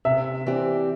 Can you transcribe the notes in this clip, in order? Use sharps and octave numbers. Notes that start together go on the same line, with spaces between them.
C3 E5
E3 C4 G4 D5